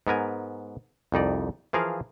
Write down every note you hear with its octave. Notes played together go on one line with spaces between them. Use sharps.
G#2 B3 A#4 G#5
C2 F2 D#4 D5
E3 F3 G#4 A#4 F5